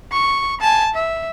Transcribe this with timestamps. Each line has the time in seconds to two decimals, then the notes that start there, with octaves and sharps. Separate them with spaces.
0.12 C#6
0.61 G#5 A5
0.94 E5